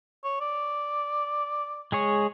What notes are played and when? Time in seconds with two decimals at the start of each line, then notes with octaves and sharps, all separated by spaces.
0.24 C#5
0.41 D5
1.92 G#3 G#4 C#5